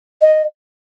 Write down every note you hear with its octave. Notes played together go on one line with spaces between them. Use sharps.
D#5